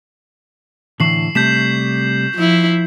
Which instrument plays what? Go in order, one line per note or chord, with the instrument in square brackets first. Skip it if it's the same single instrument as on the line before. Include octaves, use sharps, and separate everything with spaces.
[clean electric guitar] A2 D3 E3 [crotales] C#6 C7 F#7
[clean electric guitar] C3 G3 A3 [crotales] G6 B6 E7
[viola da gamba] F3 E4